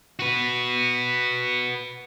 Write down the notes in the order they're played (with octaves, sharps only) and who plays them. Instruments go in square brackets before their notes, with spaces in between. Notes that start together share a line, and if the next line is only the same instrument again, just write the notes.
[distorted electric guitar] F#4 B4